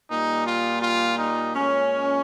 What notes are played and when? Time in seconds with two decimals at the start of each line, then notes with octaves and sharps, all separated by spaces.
0.10 A#2 G3 D#4
0.46 F4
0.82 F4
1.18 D#4
1.55 A#2 G#3 C#4